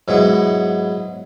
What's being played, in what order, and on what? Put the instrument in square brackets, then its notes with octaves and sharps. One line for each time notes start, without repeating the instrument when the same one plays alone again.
[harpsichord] G#2 F#3 B3 E4